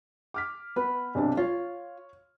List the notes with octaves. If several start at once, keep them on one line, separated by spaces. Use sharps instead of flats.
D6 F6 B6
B3 B4
B1 C3 D4
F4 C#5